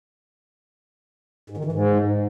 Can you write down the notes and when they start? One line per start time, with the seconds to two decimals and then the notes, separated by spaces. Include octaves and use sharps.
1.50 G#2
1.57 D#3
1.65 E3
1.72 G#2